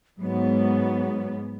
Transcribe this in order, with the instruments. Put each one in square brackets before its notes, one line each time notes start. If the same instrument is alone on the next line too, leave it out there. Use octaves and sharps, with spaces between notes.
[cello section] G#2 B3 [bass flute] F#3